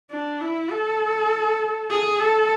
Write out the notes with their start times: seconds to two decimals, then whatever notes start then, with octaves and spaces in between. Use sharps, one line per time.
0.11 D4
0.41 E4
0.71 A4
1.90 G#4
2.20 A4